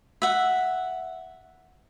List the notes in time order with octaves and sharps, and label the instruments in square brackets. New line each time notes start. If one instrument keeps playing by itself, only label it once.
[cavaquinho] E5 F#5